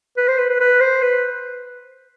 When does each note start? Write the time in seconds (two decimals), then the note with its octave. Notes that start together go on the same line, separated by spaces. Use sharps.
0.17 B4
0.28 C5
0.38 B4
0.49 B4
0.60 B4
0.80 C5
1.02 B4